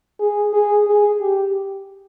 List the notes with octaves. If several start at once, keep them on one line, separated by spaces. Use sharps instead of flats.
G#4
G#4
G#4
G4